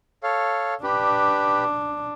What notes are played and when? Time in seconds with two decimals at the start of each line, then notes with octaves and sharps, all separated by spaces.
0.23 A4 C#5 F5
0.83 D4 G4 B4